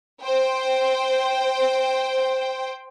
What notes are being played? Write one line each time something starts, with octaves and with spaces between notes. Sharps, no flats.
C5 G5